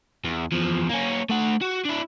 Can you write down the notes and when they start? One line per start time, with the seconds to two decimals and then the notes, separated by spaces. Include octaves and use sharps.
0.25 E2
0.52 E2 F3
0.89 A#3 C#4
1.30 A3 F#5
1.61 F#4
1.85 D4 E4